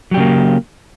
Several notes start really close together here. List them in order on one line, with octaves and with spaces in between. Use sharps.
F#3 G4 C#3 A#3